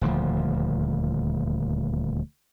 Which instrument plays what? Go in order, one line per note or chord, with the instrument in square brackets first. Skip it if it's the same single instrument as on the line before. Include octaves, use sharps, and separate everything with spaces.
[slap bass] D#1 D2 F3